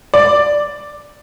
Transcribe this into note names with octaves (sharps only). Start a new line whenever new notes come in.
D5